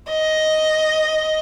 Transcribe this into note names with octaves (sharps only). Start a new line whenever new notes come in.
D#5